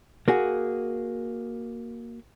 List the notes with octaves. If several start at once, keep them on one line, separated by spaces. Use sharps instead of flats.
A#3 F#4 G#4